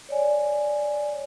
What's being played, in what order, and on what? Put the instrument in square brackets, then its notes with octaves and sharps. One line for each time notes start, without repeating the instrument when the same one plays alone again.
[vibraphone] C#5 D5 G#5